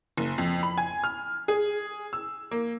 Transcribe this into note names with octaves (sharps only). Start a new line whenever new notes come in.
F#1
F2
B5
G#5
F6
G#4
E6
A#3